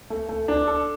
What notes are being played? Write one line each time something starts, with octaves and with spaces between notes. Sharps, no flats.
A3
A3
D4
A4